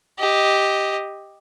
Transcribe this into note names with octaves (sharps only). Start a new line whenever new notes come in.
G4 D#5